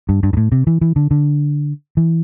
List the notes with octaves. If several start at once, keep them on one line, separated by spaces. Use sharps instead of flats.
G2
G2
G2
A2
C3
E3
E3
D3
D3
E3